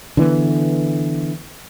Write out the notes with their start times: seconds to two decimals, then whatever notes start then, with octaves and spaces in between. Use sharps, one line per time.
0.17 D3 E3 B3